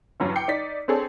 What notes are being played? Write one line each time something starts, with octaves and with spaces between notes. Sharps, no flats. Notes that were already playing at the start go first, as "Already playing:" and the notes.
E2 G2 F#3 C#4 E4
G5 D6 C7 C#7
D#4 D5 B6
C4 D4 G#4 A4 C#5